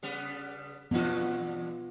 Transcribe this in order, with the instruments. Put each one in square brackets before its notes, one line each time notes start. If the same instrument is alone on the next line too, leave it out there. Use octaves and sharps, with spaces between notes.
[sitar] C#3 G3 B3
[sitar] E2 G2 F#4 [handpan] B3 F4